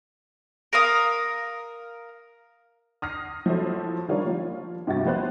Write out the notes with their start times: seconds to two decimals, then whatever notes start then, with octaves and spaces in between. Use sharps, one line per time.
0.73 A#4 F5 D#6
3.02 D#6 F6 A#6 C7
3.46 F3 F#3 E4 A4 C5
4.08 D#3 G3 D4 F4 A#4 C#5
4.27 F3 F4
4.87 G2 C3 F#4 G5 A6
5.05 F3 B3 C5 F#6